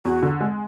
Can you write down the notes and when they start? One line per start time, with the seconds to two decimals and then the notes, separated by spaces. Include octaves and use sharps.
0.05 E2 F#4
0.22 D3
0.41 G#3